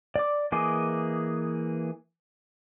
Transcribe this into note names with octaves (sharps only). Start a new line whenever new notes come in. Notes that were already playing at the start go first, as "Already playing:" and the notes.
D5 D6
E3 A#3 G#4 D#5 D6